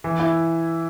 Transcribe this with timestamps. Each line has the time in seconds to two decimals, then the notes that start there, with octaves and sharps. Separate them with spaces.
0.04 E3
0.19 E4